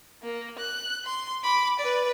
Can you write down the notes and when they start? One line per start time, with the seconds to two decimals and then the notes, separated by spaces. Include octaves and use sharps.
0.22 A#3
0.58 F#6
1.05 C6
1.43 B5 D6
1.79 B4 D5